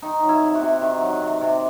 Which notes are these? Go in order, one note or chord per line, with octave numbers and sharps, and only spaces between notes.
D#3 D#4
F#3
E4
C3
F#4
C3
D#3
F#3
C3
C3